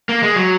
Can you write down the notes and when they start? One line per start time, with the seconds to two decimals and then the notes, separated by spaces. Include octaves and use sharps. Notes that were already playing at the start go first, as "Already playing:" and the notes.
0.09 A#3
0.23 G#3
0.36 F#3